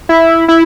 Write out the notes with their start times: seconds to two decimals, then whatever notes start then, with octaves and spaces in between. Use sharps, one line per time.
0.09 E4
0.48 E4